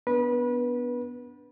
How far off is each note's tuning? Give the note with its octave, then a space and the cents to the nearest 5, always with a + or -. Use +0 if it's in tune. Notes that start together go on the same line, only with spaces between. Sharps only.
B3 +0 D4 -15 B4 -25